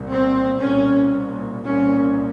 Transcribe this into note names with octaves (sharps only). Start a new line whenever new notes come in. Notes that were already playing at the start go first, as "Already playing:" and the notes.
Already playing: C2 A#2
C4
C2 A#2 C#4
C2 A#2 C#4